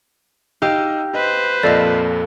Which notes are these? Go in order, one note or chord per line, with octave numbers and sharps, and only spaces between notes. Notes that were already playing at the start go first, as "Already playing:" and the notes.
D#4 G4 D#5 F5 E6
B4 C5 D#5
F2 A#2 A4 D5 D#5 F5